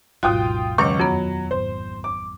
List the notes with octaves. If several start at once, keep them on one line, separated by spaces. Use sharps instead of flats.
G#1 D#2 B2 F#3 F4 F#4 G5 D#6
C#2 F#2 D#3 F#3 C#5 C#6 D6
F2 F#3 B3
G#1 C5
D6